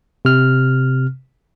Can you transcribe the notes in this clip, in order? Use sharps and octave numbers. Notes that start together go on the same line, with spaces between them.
C3 F6